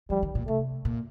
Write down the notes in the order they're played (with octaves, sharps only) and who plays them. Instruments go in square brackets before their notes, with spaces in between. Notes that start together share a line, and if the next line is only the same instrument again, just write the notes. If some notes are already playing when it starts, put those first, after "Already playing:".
[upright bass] F3 [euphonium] G3
[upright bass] D#3
A#2
[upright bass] C3 [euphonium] A3
[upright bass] A#2